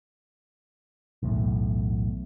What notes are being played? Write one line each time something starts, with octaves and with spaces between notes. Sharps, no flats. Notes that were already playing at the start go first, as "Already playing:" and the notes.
B1 E2 A2